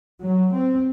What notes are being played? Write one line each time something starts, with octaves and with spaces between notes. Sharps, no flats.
F#3
C4